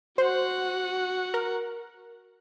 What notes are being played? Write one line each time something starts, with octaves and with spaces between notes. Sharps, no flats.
F#4 C5 F#5
A#4